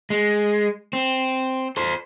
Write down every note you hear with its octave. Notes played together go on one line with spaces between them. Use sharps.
G#3
C4
A4 C5